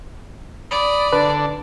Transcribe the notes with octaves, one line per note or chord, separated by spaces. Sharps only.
D5 B5 D#6
D3 D4 B4